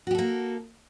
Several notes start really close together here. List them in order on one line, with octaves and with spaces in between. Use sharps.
F#4 G4 A4 A#3